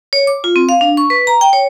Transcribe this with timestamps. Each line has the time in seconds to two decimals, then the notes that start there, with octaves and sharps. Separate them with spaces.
0.13 C#5
0.27 D6
0.44 F4
0.56 C4
0.69 F5
0.81 D4
0.97 C#6
1.10 B4
1.27 A#5
1.41 G5
1.53 C#5